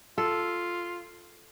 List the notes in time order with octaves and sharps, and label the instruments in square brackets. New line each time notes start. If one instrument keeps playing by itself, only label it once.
[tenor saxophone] F4 [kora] A4